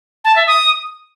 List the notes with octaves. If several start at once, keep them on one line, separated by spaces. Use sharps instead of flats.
A5
E5
D#6